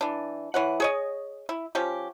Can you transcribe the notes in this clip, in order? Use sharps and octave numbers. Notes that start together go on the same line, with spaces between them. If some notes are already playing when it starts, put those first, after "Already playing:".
E3 D4
E3 C#5 F#5
G#4 C#5 D#5
E4
F3 C#4 G4